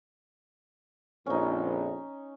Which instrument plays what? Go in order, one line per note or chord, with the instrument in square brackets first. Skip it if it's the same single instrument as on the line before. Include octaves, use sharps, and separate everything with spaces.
[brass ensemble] A#1 F2 [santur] C#4 D#4